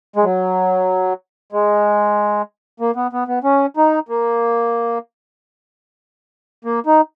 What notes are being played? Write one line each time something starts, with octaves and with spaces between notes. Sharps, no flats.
G#3
F#3
G#3
A#3
B3
B3
B3
C#4
D#4
A#3
A#3
D#4